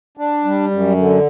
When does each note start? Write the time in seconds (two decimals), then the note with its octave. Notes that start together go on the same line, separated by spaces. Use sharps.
0.17 D4
0.45 G3
0.71 F#2
0.97 D3